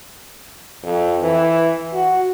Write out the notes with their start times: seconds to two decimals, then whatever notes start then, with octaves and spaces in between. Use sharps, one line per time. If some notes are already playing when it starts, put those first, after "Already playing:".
0.83 F2
1.21 E3
1.93 F#4